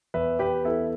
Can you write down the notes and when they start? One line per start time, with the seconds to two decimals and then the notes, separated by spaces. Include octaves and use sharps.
0.14 E2 B4 E5
0.39 E2 G4 B4
0.64 B3 E4 A4